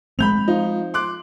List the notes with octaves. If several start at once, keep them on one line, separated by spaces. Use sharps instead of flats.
G#3 A3 C4 B5 G6 F7
F3 D#4
C6 D6 F#6